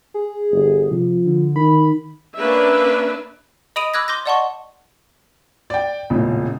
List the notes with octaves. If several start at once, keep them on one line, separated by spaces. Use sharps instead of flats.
G#4
G1
C3 F3
D3
D#3 B5
A#3 C#4 D4 B4 D5 E5
D#5 B5 D#6 D7 D#7 F7
B5 D6 E6 F#6 G#6 A#6
C6 D6 G6 A#6
D5 D#5 F#5 A5 C6 C#6
D5 G5
E1 A1 A#2 C#3